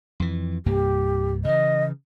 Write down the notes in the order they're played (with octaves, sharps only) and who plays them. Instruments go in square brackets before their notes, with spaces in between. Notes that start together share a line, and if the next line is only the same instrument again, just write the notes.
[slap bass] F2 E3
[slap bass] C2 G2 A#3 [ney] G4
[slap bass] C#3 E3 [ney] D#5